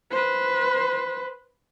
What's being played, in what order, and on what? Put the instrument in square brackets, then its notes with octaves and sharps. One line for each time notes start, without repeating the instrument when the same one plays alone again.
[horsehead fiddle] B4 C5